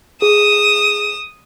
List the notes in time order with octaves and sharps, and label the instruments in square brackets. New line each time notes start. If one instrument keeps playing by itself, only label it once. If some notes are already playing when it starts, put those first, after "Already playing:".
[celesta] G#4 [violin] D#6 E7